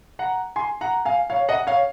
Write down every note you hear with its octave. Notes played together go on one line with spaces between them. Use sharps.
F#5 A#5
G#5 C6
F#5 A#5
F5 G#5
C#5 F5
D#5 F#5
C#5 F5